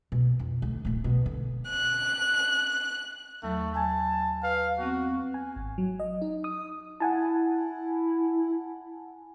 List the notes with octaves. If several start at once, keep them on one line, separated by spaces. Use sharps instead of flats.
B2
F2
D2
D1 A#2
B2 F#3
D3
F#6
D#2 F#3 A3
G#5 A5 G#6
B4 F5
B3 C4 F#4
G#5
G#1
F#3
D#5
D#4
D#6
E4 F#5 G#5 A5